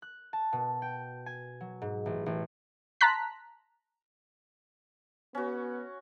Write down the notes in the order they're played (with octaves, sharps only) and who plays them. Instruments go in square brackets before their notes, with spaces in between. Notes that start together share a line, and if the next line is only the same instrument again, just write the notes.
[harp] F#6
A5
B2
G5
G#5
F#3
G#2
A1
A1
[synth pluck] A5 A#5 C6 F#6 B6
[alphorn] B3 [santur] C#4 F#4